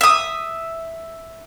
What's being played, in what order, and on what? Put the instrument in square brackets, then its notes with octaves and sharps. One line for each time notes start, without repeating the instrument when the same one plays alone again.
[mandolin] E5 D#6